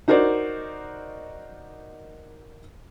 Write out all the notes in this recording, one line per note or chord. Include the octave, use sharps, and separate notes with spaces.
D#4 F#4 A#4 C5 D5